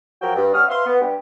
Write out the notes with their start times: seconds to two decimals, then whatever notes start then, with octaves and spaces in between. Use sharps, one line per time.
0.21 F3 F#3 F#4 A#4 G5
0.35 G2
0.53 G3 B3 C#4 D#6 F6
0.69 B4 E5 F5 C6
0.85 B3
1.01 G2 G4